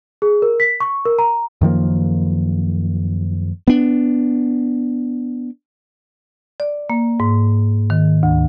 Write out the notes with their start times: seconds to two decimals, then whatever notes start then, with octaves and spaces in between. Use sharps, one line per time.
0.22 G#4
0.42 A#4
0.60 B6
0.80 C#6
1.05 A#4
1.19 A#5
1.61 F#2 D#3 F3 A#3
3.68 B3 D4
6.60 D5
6.90 A#3
7.20 G#2
7.90 D#3
8.23 D2